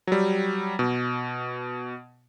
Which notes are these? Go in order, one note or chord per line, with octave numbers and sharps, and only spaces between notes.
F#3 G3
B2